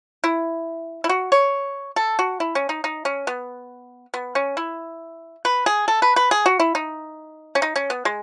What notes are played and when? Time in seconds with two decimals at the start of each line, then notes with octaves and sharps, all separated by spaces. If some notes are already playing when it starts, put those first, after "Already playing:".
0.24 E4
1.04 E4
1.09 F#4
1.32 C#5
1.96 A4
2.19 F#4
2.40 E4
2.55 C#4
2.69 D#4
2.84 D#4
3.05 C#4
3.27 B3
4.14 B3
4.35 C#4
4.57 E4
5.45 B4
5.66 G#4
5.88 A4
6.02 B4
6.16 B4
6.31 G#4
6.46 F#4
6.60 E4
6.75 D#4
7.55 C#4
7.62 D#4
7.76 C#4
7.90 B3
8.05 G#3